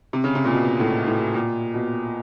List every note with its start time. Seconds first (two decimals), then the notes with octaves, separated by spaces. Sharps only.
0.13 C3
0.24 C#3
0.35 C3
0.45 A#2
0.53 B2
0.80 A2
1.07 A2
1.34 A#2
1.74 B2